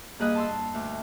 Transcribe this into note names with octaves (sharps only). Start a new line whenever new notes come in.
G2 A#3 G#4 B4 D#5 F#6
A5 C6 E6
D2